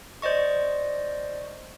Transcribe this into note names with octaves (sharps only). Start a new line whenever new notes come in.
C5 D5 D#5 C#6